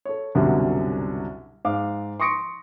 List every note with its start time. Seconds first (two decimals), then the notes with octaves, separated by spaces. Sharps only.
0.05 A4 C#5
0.35 C2 F#2 B2 D3 F#3 G3
1.65 G#2 F5 D6
2.20 C6 C#6 D#6 A#6 C#7 D7